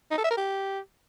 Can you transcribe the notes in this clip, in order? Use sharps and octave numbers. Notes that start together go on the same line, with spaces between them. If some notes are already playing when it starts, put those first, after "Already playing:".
D#4
A4
E5
A#4
G4